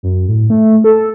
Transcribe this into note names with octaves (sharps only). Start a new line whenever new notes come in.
F#2
A2
A3
A4